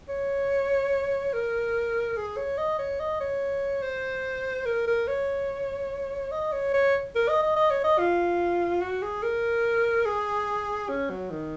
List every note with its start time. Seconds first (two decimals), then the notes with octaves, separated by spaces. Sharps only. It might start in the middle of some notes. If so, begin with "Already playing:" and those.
0.09 C#5
1.34 A#4
2.17 G#4
2.37 C#5
2.58 D#5
2.79 C#5
3.00 D#5
3.20 C#5
3.83 C5
4.66 A#4
4.87 A#4
5.08 C#5
6.32 D#5
6.52 C#5
6.74 C#5
7.15 A#4
7.29 D#5
7.43 D#5
7.56 D#5
7.71 C#5
7.84 D#5
7.99 F4
8.81 F#4
9.02 G#4
9.23 A#4
10.06 G#4
10.89 C#4
11.10 F#3
11.30 D#3